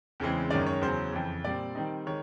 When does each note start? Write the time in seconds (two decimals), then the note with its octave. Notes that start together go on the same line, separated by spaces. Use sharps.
0.20 E2 C#3 E3 G#3 C4
0.50 F#2 D#3 G#3 C#4 D5
0.67 C#5
0.81 E2 C#3 F#3 C5
1.13 F2 C#3 E3
1.44 A#2 G3 C4 D5
1.75 D#3 G3 C4 D#4
2.06 D#3 G#3 C#5